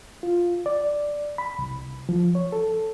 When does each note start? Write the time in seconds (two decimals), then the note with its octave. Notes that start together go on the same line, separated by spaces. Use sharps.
0.23 F4
0.66 D5
1.38 B5
1.59 C2
2.09 F3
2.35 C#5
2.52 A4